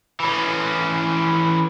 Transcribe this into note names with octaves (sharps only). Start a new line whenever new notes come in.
E3 C#4